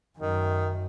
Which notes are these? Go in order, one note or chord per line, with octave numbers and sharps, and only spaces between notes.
F#2 D#3